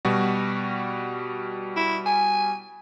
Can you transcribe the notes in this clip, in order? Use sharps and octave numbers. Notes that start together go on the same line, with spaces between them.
B2 G3 F#4
E4
G#5